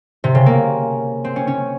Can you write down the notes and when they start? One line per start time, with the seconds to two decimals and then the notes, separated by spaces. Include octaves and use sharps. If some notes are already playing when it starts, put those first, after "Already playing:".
0.24 C3
0.35 C#3
0.46 A#3
1.24 C4
1.36 C#4
1.47 C#4